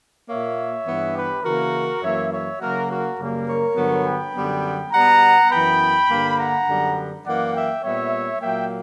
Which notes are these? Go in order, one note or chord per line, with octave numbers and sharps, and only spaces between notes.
A#2 A#3 C#5 E5
G2 E3 B3
G4 B4
C#3 E3 A#3 F#4 A#4
F#2 E3 A#3 C#5 E5
C#5 E5
C#3 F#3 A#3 F#4 A#4
F#4 A#4
F#2 C#3 G3 A#3
A#4 C#5
G2 D3 F#3 B3
G5 B5
F#2 D3 G3 B3
B2 G3 B3 F#5 A#5
F#2 E3 B3 G5 B5
G2 D3 A#3
F#5 A#5
F#2 D3 G3 B3
F#2 E3 A#3 D5 F#5
E5 G5
A#2 G3 B3 C#5 E5
A#2 F#3 A#3 E5 G5